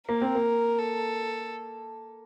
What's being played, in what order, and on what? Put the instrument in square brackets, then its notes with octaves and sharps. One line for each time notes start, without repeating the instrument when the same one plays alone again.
[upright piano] A#3 [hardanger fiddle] A#4
[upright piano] C4
A#3
[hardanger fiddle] A4